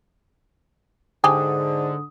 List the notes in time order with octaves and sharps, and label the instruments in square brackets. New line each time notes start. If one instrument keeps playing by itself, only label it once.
[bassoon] G#2 [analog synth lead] D3 [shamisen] D4 G4 G#5 [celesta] D#6